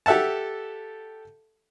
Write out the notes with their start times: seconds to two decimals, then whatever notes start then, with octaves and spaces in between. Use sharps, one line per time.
0.06 G4 A4 E5 F#5 A5